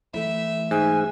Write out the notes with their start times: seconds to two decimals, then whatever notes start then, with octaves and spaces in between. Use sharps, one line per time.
0.14 E3 A3 E4 E5
0.71 G#2 G#5